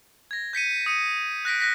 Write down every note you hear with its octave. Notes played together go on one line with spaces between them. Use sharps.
G#6 A#6
G6 B6 C#7 D#7
D#6 C#7 D#7
F#6 A#6 B6 D7
F#6 A#6 B6